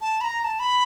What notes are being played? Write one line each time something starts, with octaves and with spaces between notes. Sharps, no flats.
A5
B5
A#5
A#5
A5
B5